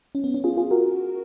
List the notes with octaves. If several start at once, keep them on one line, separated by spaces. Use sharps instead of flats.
C#4
B3
C#4
F4 G#4
F4 G#4
F#4 A#4